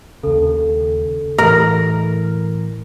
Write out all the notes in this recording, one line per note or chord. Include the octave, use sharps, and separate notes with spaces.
D#2 C#3 A4
A2 E3 A#4